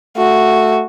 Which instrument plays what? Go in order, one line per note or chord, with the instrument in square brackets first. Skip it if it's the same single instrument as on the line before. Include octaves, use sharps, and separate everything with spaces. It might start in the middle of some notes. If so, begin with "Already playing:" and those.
[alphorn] A3 [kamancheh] F#4